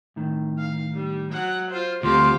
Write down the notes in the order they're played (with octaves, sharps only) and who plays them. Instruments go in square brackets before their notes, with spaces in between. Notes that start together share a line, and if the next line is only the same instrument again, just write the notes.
[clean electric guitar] A2 D#3
[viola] F5
G3
F#3 F#5
F4 C5
[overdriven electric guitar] D2 [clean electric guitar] G3 C4 A4 [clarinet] F4 [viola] G4 F5